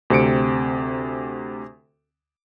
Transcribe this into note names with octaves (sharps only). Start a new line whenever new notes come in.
D2 C3 C4 C#7 D7